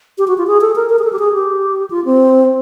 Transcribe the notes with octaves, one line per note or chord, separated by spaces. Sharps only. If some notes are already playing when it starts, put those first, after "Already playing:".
G4
F#4
F4
G#4
A4
A#4
A#4
G#4
A4
G4
G#4
G4
F4
C4